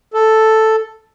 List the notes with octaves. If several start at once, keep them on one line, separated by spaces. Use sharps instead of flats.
A4